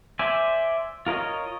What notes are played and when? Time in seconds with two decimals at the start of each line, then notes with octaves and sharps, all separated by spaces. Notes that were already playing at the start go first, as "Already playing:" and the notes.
0.19 C5 D5 E5 G#5
1.06 F4 A#4 C#5 D#5